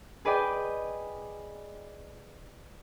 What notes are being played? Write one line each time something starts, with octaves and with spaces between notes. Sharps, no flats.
G#4 B4 D5 D#5 G5 G#5